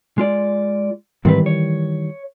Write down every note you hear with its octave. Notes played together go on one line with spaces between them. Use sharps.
G#3 F4 D5
G#2 D#3 E3 G3 C4 B4
C#5